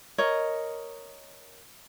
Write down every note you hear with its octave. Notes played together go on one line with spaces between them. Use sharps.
A#4 C#5 D#5